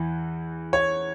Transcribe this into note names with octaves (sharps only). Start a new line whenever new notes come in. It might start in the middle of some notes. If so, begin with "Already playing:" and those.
Already playing: E2 E3
C#5